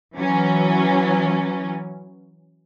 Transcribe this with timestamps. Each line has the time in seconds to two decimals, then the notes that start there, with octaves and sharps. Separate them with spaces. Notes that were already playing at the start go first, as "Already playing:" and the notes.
0.16 E3 F#3 C#4